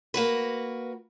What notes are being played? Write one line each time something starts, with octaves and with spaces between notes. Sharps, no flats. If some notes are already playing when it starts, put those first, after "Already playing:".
A#3 F#4 B4